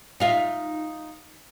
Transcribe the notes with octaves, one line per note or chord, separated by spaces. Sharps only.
D#4 F4 E5